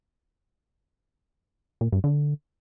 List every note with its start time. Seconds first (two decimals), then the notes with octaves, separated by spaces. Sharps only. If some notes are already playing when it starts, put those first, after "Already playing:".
1.81 A#2
1.92 G2
2.04 D3